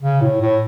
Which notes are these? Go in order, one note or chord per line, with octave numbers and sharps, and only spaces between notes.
C#3
A2
A2